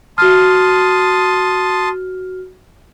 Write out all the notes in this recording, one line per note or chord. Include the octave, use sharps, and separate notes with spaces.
F#4 A5 C6 D#6 F6